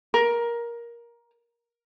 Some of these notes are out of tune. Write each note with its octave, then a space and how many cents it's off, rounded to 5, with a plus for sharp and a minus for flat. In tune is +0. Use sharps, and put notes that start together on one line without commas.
A#4 +15